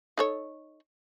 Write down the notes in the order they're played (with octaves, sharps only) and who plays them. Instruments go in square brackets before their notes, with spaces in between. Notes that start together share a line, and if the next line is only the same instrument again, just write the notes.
[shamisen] D#4 A4 C#5